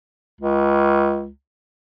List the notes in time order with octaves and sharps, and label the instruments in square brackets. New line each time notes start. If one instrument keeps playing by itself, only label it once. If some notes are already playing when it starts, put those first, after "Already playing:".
[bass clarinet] C#2